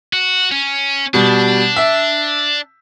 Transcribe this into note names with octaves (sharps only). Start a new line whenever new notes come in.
F#4
C#4
B2 G3 D4
E5